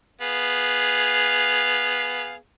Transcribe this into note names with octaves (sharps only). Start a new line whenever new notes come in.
B3 G#4 F5